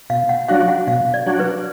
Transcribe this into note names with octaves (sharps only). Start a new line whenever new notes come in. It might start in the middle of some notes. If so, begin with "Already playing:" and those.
B2 F5
F#5
F#3 D4 F#4 F5
F#5
B2 F5
D5
F#3 D4 F#4 D5
B4